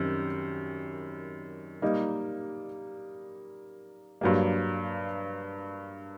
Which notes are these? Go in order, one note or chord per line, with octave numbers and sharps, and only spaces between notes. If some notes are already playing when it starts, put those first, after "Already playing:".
Already playing: F#2 D#3 G3 C4
G3 A#3 D#4
G2 F#3 A#3